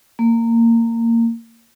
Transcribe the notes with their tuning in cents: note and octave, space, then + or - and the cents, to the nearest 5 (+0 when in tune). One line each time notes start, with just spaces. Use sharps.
A#3 -20